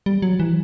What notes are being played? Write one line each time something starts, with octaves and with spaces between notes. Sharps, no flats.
G3
F#3
E3